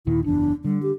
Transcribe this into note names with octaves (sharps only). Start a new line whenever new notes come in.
D#2 A#2 D#3 E4
F#1 E2 D4
D3 G3
G4